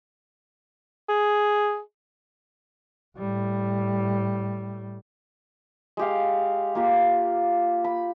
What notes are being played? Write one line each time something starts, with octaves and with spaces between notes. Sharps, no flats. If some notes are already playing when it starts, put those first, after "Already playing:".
G#4
A2 G3
G#3 G4 F5
A#3 F4 G4
B5